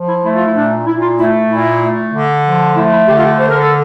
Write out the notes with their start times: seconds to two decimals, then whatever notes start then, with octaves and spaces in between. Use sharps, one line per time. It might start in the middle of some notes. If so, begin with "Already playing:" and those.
Already playing: F3
0.08 E4
0.23 A3 E4
0.34 F4
0.44 E4
0.56 A#2 D4
0.86 A#2 E4
1.02 F4
1.18 A3 E4
1.50 A#2 E4
1.82 A3
2.12 D3
2.45 F3
2.76 A3 E4
2.91 E4
3.07 D3 G4
3.17 F4
3.23 G4
3.39 D3 C5
3.50 A#4
3.60 A4